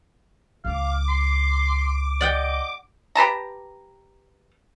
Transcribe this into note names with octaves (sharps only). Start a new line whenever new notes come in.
C#2 F5 D6
C6
D5 D#5 F#5 G5
G4 B4 A5 A#5